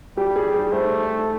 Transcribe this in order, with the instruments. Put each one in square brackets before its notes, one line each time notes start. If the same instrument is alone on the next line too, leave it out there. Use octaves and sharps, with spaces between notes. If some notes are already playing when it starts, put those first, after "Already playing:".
[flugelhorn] G3 [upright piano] G4
[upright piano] G#4
G#4
[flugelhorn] A3 [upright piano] C5